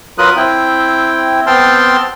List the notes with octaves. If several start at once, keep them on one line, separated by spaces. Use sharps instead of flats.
F#3 F4 A#4 B4 D#6 F#6
C4 E4 G5
B3 C4 G5 A5 C6 F6